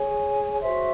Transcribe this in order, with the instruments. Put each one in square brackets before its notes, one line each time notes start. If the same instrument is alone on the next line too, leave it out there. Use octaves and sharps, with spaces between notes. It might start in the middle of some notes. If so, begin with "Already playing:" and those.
Already playing: [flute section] G#4 C#5 G#5
F#4 C5 E5 C6